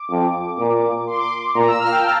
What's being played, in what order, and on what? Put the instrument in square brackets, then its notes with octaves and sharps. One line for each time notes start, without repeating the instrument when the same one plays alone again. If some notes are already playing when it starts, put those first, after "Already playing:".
Already playing: [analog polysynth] D6
[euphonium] F2
A#2
[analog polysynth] C6
D6
C6
[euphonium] A#2 [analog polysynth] A#5
[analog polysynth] E6
F6
F5
G5
A5